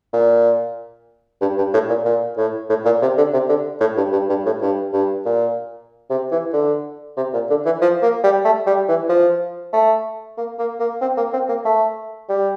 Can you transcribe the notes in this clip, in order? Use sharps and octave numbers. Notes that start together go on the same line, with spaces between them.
A#2
G2
G2
A2
A#2
A#2
A2
A2
A#2
C3
D3
C3
D3
A2
G2
G2
G2
A2
G2
G2
A#2
C3
E3
D3
C3
A#2
D3
E3
F3
A#3
G3
A3
G3
E3
F3
A3
A#3
A#3
A#3
C4
A#3
C4
A#3
A3
G3